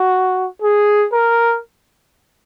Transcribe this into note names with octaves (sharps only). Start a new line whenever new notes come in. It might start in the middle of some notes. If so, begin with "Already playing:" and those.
Already playing: F#4
G#4
A#4